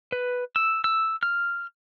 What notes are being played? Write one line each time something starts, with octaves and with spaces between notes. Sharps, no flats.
B4
E6
E6
F6